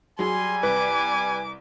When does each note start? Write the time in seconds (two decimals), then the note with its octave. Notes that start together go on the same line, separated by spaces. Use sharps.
0.19 F#3 G3 G#4 G#5 C6
0.63 C2 B4 D6